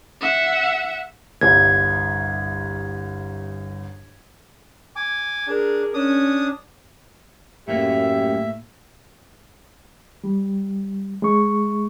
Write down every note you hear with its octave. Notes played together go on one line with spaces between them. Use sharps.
E5 F#5
G1 C2 G#6
G#5 D6
D4 G#4 A#4
C#4 D4 D#6
F#2 A2 A3 A#3 G4 E5
G3
G#3 C#6